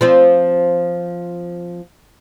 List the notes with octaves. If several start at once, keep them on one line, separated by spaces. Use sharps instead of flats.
F3 C4 F4